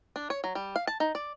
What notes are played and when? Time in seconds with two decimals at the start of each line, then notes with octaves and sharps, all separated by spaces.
0.16 D4
0.30 C#5
0.44 F#3
0.55 G3
0.76 F5
0.87 A5
1.00 D#4
1.15 D5